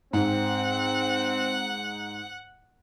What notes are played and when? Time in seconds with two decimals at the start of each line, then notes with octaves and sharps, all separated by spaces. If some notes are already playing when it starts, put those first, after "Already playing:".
0.13 G#2 C4 F#5